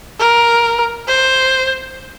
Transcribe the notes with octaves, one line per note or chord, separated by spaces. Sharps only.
A#4
C5